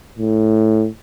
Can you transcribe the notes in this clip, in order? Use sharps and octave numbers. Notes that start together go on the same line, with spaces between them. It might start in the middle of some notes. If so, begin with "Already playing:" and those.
A2